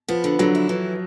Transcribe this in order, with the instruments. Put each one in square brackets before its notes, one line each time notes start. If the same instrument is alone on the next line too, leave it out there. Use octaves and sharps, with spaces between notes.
[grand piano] F3 [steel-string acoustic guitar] B3
[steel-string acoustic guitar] D3
[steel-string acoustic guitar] D3 [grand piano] F#3
[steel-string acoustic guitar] E4
E3